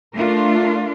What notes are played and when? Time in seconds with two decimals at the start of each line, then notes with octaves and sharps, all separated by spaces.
0.15 A3 D4 F4 A#4